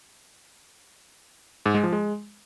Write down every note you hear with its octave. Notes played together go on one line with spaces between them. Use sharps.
G#2
G#3
F3
G#3